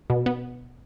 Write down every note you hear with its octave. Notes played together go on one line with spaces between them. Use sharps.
B2
B3